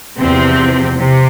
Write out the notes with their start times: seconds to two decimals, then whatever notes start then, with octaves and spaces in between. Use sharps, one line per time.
0.19 E2 C3 F3 C4
0.99 C3